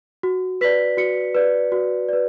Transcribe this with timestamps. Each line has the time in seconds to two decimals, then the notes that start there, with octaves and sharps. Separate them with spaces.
0.23 F#4
0.61 B4 D5 B6
0.97 F#4 C#7
1.35 B4 D5
1.72 F#4
2.09 B4 D5